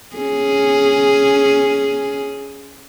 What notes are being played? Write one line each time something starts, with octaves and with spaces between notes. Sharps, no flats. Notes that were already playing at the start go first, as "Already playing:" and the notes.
C#4 G#4